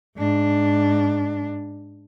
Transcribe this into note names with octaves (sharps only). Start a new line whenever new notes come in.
G#2 D4